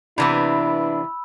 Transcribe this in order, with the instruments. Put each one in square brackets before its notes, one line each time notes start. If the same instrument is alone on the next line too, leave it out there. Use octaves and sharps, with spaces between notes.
[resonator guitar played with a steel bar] C3 E3 B3 [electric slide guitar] D4 [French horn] E4 [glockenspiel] B5 E6